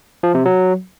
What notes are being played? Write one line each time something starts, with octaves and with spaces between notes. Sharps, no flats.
F3
C3
F#3